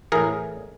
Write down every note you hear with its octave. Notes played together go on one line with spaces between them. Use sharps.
A2 E3 G#4 A#4